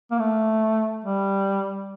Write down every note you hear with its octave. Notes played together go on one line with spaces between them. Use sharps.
A#3
A3
G3